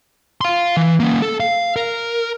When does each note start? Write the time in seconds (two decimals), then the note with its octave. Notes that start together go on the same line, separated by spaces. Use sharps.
0.41 F5 C6
0.77 E3
1.00 A#3 C#4
1.22 A4
1.40 F5
1.76 A#4